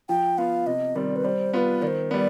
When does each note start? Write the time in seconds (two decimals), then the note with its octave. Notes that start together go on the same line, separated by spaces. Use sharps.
0.09 F3 G5
0.38 B3 F4 F5
0.66 C3 D#5
0.95 D#3 G3 C4 D5
1.16 B4
1.24 G3 C5
1.53 B3 F4 B4 C5
1.82 D#3 D5
1.87 C5
2.11 G3 B3 D5